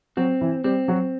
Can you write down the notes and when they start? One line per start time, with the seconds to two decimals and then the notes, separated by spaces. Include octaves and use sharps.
0.17 F#3 C4 F#4
0.41 E3 E4
0.64 G3 C4 G4
0.88 F#3 F#4